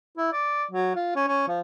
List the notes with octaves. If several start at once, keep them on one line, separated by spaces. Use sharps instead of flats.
E4
D5
F#3
F4
C#4
C#4
F3